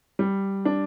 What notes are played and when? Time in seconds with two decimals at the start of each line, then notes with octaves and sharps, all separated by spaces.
0.19 G3
0.65 D4